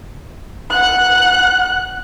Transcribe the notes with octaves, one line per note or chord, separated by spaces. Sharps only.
F#5 F#6